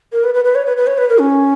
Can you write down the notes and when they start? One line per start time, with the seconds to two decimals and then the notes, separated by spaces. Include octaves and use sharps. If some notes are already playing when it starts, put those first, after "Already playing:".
0.12 A#4
0.24 B4
0.34 B4
0.45 B4
0.55 C#5
0.66 B4
0.77 B4
0.87 C#5
0.98 B4
1.09 A#4
1.19 C#4